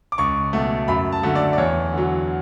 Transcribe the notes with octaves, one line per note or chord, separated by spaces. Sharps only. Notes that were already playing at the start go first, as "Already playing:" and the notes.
D6
C#2 C#6
B2 F#3 A3
F#2 B5
A5
D3 F#3 A3
D5
D5
E2 C#5
D3 F#3